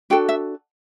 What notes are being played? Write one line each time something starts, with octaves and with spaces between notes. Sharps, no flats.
D4 F#4 A4 G5
E5